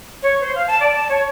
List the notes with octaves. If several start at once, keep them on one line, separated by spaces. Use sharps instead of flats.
C#5
C5
F5
A5
D5
A5
C#5